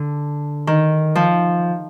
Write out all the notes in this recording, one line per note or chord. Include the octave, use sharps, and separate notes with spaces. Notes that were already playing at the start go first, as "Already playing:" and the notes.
Already playing: D3
D#3
F3